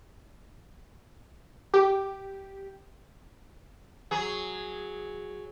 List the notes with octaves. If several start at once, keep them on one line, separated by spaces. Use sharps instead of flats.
G4
F#3 G#4